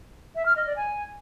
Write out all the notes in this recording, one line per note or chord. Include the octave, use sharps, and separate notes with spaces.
E5
F6
D#5
D5
G#5